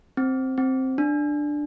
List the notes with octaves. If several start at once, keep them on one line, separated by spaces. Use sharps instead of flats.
C4
C4
D4